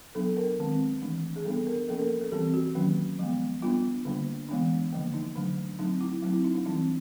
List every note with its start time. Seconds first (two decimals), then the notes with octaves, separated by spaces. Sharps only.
0.15 F#3 B3 D4 A4
0.36 A#4
0.59 D#3 G#3 C4
1.02 E3 A3 D4
1.36 G#4
1.45 G3 B3 D4 A4
1.67 A#4
1.88 F3 A#3 C#4 A4
1.99 A#4
2.21 A4
2.32 E3 G3 C4 G4
2.54 F#4
2.75 D#3 F#3 A#3 C#4
3.19 F3 G#3 B3
3.62 G3 B3 D4 F4
4.05 D3 G3 A#3 D4
4.49 E3 G#3 B3 D4
4.92 D3 F3 A#3
5.14 D#4
5.36 D3 F#3 A3 D4
5.79 F#3 A3 C4 D#4
6.01 E4
6.22 F#3 A3 C4 E4
6.33 E4
6.44 D#4
6.55 D4
6.65 E3 G3 C4 D#4